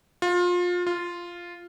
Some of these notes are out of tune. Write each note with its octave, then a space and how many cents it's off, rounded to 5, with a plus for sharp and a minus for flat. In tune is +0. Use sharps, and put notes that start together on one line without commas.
F4 +25
F4 -5